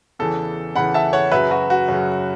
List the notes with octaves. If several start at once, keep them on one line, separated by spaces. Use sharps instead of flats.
E2 C#3 E3 A4
E2 C#3 E3 F#5 B5
E5 A5
C#5 F#5
F#2 C#3 F#3 B4 E5
F#4 B4
F#4
F#2 C#3 F#3